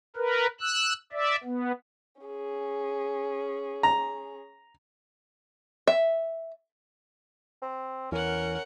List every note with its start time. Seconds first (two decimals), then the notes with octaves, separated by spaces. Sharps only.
0.16 A#4 B4
0.61 E6 F#6
1.12 D5 E5
1.44 B3
2.22 C#4 G#4
3.83 A#5
5.88 E5
7.62 C4
8.12 E2 E3 C#4 A#4 F#5